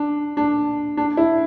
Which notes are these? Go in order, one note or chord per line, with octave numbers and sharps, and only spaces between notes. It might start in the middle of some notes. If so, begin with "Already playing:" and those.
Already playing: D4
D4
D4
E4